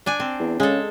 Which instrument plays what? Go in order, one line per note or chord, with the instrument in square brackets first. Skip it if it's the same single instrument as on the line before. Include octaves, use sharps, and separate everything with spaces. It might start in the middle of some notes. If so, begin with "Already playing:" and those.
[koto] D4 D5 G#5
C4
[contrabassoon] E2
[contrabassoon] C#3 [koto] G#3 A4